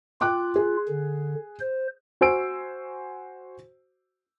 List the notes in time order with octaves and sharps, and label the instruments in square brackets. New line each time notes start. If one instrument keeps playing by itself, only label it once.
[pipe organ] F4 [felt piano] G5 D6 F#6
[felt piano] G#4
[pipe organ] D3
C5
[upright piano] F#4 C5 G#5 E6 D7